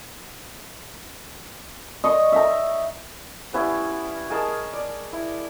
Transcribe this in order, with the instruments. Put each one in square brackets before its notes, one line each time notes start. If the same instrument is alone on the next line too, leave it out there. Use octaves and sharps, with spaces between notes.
[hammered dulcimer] D#5 C#6
E5 A#5
[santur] G3 B3 C#4 E4
G#4 A#4 D#5 A5
D5
E4